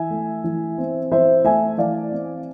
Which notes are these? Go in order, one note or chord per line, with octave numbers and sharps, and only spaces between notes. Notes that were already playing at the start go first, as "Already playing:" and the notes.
Already playing: E3 E5 G#5
A3
E3
C4
E3 C5 E5
A3 E5 G#5
E3 D5 F5
C4